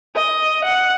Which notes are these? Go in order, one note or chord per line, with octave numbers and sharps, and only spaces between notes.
D#5
F#5